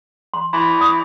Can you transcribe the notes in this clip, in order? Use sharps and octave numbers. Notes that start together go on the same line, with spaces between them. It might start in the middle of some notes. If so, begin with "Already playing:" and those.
C6
E3 C6
D#6